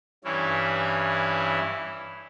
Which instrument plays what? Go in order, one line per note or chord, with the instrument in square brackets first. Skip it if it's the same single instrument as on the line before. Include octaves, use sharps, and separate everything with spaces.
[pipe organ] G2 E3 C#4 E4